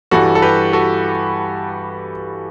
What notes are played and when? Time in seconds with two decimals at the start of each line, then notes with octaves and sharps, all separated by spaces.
0.11 G2 E3 G3 F#4 A4
0.35 A4
0.42 G4 B4
0.73 F#4 A4